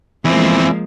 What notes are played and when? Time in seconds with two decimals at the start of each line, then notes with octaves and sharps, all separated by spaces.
0.25 E2 E3 F3 G#3 A#3 C4